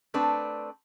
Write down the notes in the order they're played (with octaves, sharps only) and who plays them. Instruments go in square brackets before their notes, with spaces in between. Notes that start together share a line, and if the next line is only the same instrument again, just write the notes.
[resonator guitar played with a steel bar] A3 C4 D4 B4